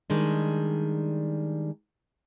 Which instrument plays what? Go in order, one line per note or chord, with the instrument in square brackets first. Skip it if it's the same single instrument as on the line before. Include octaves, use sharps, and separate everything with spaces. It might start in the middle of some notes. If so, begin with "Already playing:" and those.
[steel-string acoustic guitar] D#3 G3 G#3 D4